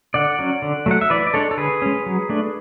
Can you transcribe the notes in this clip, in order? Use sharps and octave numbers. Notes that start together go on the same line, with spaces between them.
D3 D5 F#5
F#3 C#4
D3
F#3 A3 F#5
E5
E3 B4 D5
D5
G#3 D4 A4 C#5
A4
D3 G#4 B4
G#3 C#4
F#3
A3 D4